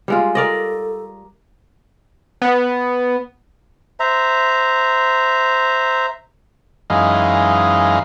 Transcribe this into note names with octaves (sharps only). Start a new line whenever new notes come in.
G3 G#3 F4
A4 A#4 D5 D#5
B3
C5 E5 A#5
F#2 E3 G#3 D#4 F5